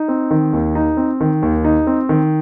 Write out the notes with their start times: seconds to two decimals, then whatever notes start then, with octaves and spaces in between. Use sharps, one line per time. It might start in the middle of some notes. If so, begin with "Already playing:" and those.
Already playing: D#4
0.08 C4
0.31 D#3
0.53 D#2
0.75 D#4
0.97 C4
1.21 D#3
1.42 D#2
1.64 D#4
1.87 C4
2.09 D#3